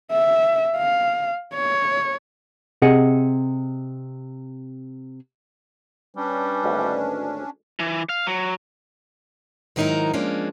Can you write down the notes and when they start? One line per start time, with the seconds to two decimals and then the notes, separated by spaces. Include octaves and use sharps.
0.12 E5
0.77 F5
1.54 C#5
2.82 C3 G#4 D#5 F#5
6.16 G3 C#4 D4 B4
6.64 G#1 D2
7.80 E3
8.09 F5
8.27 F#3
9.76 G#2 D#3 F#3 D#4 E4 A#4
10.13 F3 G#3 A#3 C#4 D4